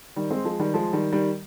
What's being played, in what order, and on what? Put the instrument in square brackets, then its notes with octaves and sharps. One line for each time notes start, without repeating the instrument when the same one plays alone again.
[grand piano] D#3 G3
G#3 C4
F3 G#3
D#3 G3
F3 G#3
D#3 G3
D#3 G3